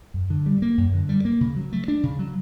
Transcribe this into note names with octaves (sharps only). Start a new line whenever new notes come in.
F#2
D3
G3
A#3
F#2
D3
G3
A#3
C#3
F#3
A3
D4
C#3
F#3